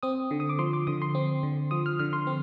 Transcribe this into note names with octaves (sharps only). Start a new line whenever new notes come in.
C4 D#6
D3
D#6
D6
F3 C6
D6
D3 D#6
C6
C4
D3
F3 D#6
F6
D3 F6
C6
C4